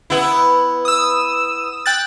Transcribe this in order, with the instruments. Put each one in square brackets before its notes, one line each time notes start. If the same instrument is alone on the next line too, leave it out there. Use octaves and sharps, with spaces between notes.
[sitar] B3 E4
[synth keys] D#6 E6
G5 F#6 A6